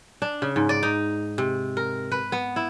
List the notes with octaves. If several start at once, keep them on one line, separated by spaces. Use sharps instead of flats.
D4
C#3
G#2
D5
D#4
C3
A#4
B4
B3
E4